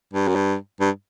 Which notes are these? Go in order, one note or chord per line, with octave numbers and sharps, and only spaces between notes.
G2
F#2
G2
G2